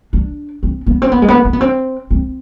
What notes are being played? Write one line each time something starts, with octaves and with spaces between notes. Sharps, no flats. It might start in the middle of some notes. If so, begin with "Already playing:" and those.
D4
C4
B3
C4
B3
G#3
B3
C4
B3
C4
C4